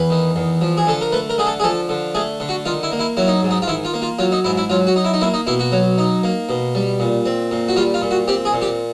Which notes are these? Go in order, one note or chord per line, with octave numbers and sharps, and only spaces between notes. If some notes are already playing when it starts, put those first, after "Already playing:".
Already playing: E2 B4
D#3
E2
F3
G#4
D3 A4
A#4
A3 B4
A#4
D3 G#4
A4
G#4
F3 A4
D3
A3 G#4
D3
F#4
D#3 F4
E4
A#3
E4
F#3 E4
D#4
G#2
D#4
F4
D#3 E4
F4
A#3
F4
F#3 F4
D#4
G#2 E4
E4
F#3 F4
F#4
D#4
E4
D#4
A#3 E4
D#4
B2 E4
F#4
F#3
D#4
A#3
B2
G3
A#2
C4
A#2
F#4
G3 F4
F4
A#2
F#4
C4 G4
G#4
A#2
G4